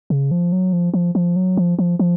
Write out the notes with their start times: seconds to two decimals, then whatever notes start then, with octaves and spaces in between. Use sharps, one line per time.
0.10 C#3
0.31 F3
0.52 F#3
0.73 F3
0.94 F3
1.15 F3
1.36 F#3
1.57 F3
1.79 F3
1.99 F3